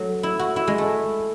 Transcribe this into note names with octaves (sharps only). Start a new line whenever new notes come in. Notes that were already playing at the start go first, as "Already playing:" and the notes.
Already playing: F#3 A3
E4
F#4
E4
G#3
A3